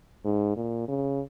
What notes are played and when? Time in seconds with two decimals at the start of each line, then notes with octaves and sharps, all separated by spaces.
0.25 G#2
0.57 A#2
0.88 C#3